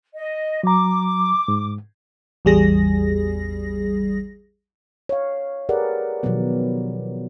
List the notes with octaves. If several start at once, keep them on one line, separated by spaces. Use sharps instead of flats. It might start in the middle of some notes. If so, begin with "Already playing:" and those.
D#5
F#3 A#5 D6
G#2
A1 E2 G3 G#4 A#6
C#5 F5
G4 G#4 A#4 B4 D5 F#5
B2 D#3 F3 F#3 B3